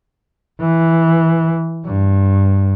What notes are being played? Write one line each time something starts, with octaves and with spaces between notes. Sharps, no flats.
E3
G2